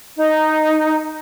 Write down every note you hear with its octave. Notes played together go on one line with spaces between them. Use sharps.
D#4